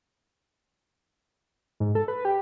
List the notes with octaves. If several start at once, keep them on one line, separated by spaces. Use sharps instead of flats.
G#2
A4
B4
G4